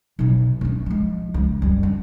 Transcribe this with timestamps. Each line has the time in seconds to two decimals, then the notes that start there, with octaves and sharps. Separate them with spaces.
0.19 B1 B2
0.61 A3 D4
0.86 F3 G#3
1.34 C#2
1.62 F#2 G3
1.83 D4